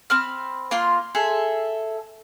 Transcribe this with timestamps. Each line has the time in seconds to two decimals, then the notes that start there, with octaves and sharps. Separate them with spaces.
0.10 C4 B5 F6
0.71 A#3 F4 C6
1.15 G#4 A4 E5